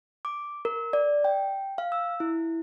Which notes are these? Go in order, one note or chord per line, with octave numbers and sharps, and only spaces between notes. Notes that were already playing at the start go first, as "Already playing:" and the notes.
D6
A#4
D5
G5
F5
E6
E4